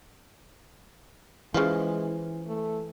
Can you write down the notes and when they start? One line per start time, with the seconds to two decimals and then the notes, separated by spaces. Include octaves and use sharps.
1.54 C#3 E3 F3 G#3
2.48 A3